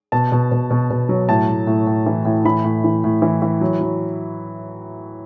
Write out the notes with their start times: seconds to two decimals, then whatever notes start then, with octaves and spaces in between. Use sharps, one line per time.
0.12 B2 A5
0.32 B2
0.52 B2
0.71 B2
0.91 B2
1.09 F#3
1.29 A2 A5
1.49 A2
1.67 A2
1.87 A2
2.06 E3
2.25 A2
2.45 E3 B5
2.64 A2
2.84 E3
3.04 A2
3.22 E3
3.42 E3
3.61 F#3
3.81 F#3